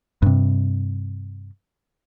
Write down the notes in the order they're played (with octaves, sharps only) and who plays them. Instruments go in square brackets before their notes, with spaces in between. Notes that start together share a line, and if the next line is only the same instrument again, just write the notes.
[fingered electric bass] G2 C3